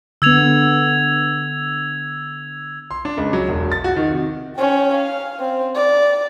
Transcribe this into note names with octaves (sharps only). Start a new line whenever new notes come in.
D3 B3 E6 G#6 F7
C6
D4
C#2
F#3
E1
A6
F#4
D#3
C3
C#4 G5
F5
C4
D5